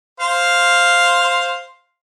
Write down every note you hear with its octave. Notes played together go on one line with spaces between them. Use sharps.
C5 F5 C6